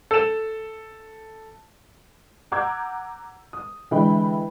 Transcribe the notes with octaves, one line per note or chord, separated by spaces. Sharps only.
A4 E7
F#5 A#5 D6 E6 G6 G#6
D#6
D3 E3 G#3 E5 G5 B5